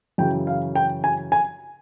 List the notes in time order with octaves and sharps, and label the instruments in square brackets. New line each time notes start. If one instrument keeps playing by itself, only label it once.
[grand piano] F#2 C#3 E3 G5
F5
G5
G#5
G#5